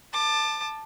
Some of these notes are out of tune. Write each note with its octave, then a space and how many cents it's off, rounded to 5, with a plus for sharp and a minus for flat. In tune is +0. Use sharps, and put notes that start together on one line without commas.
A5 +0 D6 +30